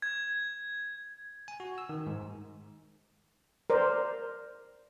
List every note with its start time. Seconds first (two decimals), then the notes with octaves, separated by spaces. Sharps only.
0.02 G#6
1.48 G#5
1.60 F#4
1.78 E6
1.89 D#3
2.07 G#2
3.70 A#4 C5 D5